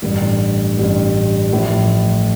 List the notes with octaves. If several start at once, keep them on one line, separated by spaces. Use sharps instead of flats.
A1 G2 D3
A1 G2 D3
A1 A2 F3